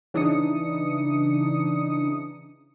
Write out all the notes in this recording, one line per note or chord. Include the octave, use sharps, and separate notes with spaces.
C#3 E3 D4 D#4 D#6 C#7